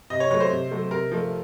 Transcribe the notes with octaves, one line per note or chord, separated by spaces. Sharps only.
C3 D#5
C#5
F#3 A3 C#5
C5
C3
F#3 A3
C3 A#4
F3 A3